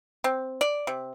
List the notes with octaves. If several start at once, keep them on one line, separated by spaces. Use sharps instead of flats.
C4
D5
C3